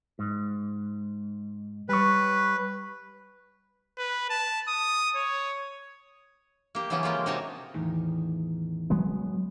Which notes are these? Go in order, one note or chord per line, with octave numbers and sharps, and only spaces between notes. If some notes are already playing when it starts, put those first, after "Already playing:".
G#2
G3 B4 C#5
B4
A5
D#6
C#5
A#3 G4
C#3 E3 F#3 A#3 B3 C#4
G#3 A#3 F4 G4
C3 D#4 F#4 A#4 C#5 A5
E2 A2 D#3
F#3 G#3 B3